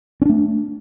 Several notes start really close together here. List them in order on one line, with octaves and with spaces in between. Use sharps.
C#4 D4 A3